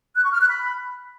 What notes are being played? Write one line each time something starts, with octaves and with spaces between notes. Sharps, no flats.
F#6
C#6
F6
F#6
B5